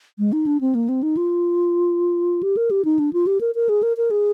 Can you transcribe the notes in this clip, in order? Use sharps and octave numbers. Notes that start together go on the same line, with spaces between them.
G#3
D#4
D4
C4
A#3
C4
D#4
F4
G4
A#4
G4
D#4
D4
F4
G4
A#4
A#4
G#4
A#4
A#4
G#4